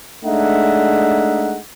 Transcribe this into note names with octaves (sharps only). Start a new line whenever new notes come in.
G#3 A3 D4 D#4 E5 F#5